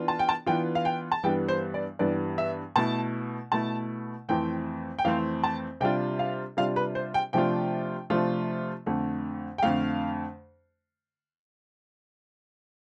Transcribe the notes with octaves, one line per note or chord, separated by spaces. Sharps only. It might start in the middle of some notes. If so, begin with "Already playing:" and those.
Already playing: E3 B3 D4 F4
A5
G5
A5
E3 B3 D4 F4 G5
F5
G5
A5
G2 E3 G3 B3 G5
C5
D5
G2 E3 G3 B3 D5
E5
B2 A3 E4 A5
B2 A3 E4 A5
F2 E3 A3 C4 G5
G5
F2 E3 A3 C4 F5
A5
C3 G3 D4 F4 G5
F5
C3 G3 D4 F4 F5
B4
C5
G5
C3 F3 A3 D4 F4 G5
C3 F3 A3 D4 F4
F2 D3 A3
G5
F2 D3 A3 F5